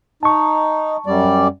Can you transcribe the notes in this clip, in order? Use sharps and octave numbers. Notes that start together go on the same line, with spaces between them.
D#4 A5 C#6
F#2 G3 D5